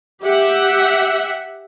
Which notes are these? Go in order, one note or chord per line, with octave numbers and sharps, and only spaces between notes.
G4 E5 F#5